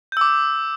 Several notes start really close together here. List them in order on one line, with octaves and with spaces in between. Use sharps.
G6 E6 D6